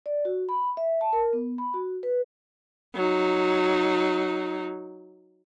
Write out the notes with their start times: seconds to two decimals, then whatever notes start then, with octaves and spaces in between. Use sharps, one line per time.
0.06 D5
0.25 F#4
0.49 B5
0.77 E5
1.01 A5
1.13 A#4
1.33 B3
1.58 B5
1.74 F#4
2.03 B4
2.95 F#3 D#4